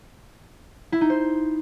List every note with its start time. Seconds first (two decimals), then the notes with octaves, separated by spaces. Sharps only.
0.92 E4
1.01 D#4
1.10 C5